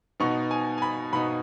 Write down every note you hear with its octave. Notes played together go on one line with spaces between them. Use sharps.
B2 B3 D#4 C#6
G#5
G#5
B5
B2 B3 D#4 B5